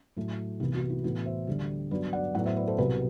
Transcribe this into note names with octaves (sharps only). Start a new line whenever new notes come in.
A2 F#3 A3
C2 C3 E3 B3 E4 G4
F#4
E4
A2 E3 B3 F#4
C5 E5
D2 D3 G3
G2 F#3 B3 B4 D5
D5 F#5
A2 F#3 B3 D5 F#5
C5 E5
B4 D5
A4 C5
C2 B2 F#3 G4 B4